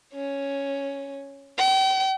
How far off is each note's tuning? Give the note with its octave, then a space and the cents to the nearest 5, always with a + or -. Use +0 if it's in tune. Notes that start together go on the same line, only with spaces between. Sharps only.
C#4 +0
G5 -40